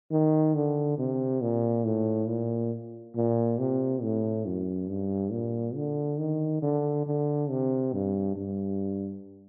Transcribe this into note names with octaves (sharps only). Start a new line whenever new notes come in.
D#3
D3
C3
A#2
A2
A#2
A#2
C3
A2
F#2
G2
A#2
D3
D#3
D3
D3
C3
G2
G2